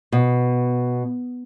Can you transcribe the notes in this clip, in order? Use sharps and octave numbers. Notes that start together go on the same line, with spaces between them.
B2